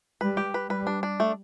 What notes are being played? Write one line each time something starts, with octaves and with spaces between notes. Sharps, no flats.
G3 B4
G4
B4
G3 B4
D4
D4
A3